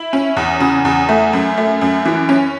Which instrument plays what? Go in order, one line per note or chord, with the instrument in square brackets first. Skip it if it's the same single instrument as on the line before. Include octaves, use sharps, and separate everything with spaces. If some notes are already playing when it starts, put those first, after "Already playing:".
Already playing: [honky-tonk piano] E4
C#4
E2
C#3
E2
A3
F#2
A3
F#2
E3
C#4